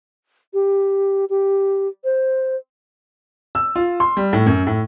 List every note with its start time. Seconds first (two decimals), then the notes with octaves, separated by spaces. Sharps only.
0.54 G4
1.30 G4
2.04 C5
3.55 E6
3.76 F4
4.00 C6
4.17 G3
4.33 A2
4.46 F#2
4.67 A2